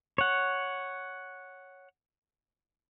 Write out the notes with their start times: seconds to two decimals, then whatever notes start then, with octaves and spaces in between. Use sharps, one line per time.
0.18 C#5 F#5